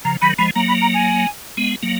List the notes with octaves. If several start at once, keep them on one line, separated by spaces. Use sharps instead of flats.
C#3 F3 A#5
D#3 F#3 B5
F3 G#3 B5
F#3 A#3 A#5
B5
A#5
G#5
G#3 B3
F#3 A#3